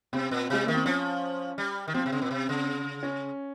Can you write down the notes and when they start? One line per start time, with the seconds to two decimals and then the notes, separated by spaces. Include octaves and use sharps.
0.13 C3 C4
0.31 A#2
0.50 C3 G#3
0.64 D#3 A#3
0.74 C4
0.86 F3 C#4
1.58 G3
1.88 D#3
1.94 F3 C4
2.06 C3
2.12 C#3
2.22 A#2
2.31 C3
2.49 C#3
3.03 C#4